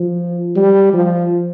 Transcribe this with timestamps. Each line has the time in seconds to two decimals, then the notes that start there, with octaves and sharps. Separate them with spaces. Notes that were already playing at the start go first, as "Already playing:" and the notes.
Already playing: F3
0.56 G3
0.93 F3